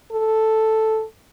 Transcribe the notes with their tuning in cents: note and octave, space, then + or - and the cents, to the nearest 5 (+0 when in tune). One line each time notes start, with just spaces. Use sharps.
A4 +0